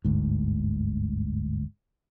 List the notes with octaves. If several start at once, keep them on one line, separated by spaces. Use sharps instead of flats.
G1 D2 G#2